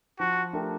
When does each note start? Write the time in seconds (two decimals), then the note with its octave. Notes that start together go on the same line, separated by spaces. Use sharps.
0.20 F3 F#4
0.53 A3 D4 G4 A#4